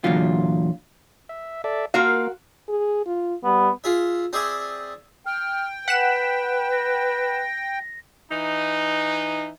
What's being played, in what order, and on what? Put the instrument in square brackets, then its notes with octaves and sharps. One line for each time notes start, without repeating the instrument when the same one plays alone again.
[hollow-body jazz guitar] E2 A#2 D3 F#3 F4
[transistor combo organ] E5
A4 D5 E5
[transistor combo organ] A#3 [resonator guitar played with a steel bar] F4 A#4 F5 [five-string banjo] F#4
[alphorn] G#4
F4
[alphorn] G3 [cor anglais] B3
[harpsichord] F4 G#4 E5
C4 G#4 D5 E5 G#5
[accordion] G5 [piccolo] F6
[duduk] B4 [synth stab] F#5 F#6 E7 [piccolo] B6
[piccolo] A#6
[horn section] E3 D#4